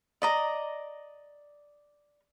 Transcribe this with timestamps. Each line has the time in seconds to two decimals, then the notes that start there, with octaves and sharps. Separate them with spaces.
0.22 D5 D#5 A#5